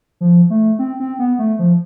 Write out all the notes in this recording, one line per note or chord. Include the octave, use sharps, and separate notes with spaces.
F3
A3
C4
C4
B3
A3
F3